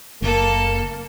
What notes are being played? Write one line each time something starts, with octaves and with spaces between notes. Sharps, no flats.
F#1 A#3 A4